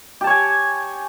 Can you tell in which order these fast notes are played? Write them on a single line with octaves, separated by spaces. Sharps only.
G4 A5 C#5 G#5